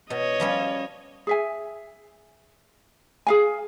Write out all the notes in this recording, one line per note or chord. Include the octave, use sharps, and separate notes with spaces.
B2 C#5 D#5
F3 G3 C#4
G#4 E5 G#5
G#4 F5 G#5